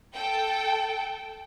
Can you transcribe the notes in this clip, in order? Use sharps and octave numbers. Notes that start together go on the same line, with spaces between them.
A4 G5